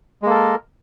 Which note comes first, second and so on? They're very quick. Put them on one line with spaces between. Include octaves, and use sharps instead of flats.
G#3 A#3 A4 A#4